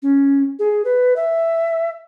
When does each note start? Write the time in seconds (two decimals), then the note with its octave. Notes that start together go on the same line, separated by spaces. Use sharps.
0.03 C#4
0.59 G#4
0.85 B4
1.16 E5